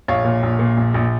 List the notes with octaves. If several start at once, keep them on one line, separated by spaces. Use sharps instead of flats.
A#1 C#5 F5
A#2
A#1
A#2
A#1
A#1